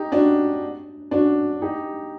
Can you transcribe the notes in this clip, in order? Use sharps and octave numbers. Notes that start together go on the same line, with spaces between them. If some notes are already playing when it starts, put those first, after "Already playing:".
Already playing: D#4 G4
D4 F#4
D4 F#4
D#4 G4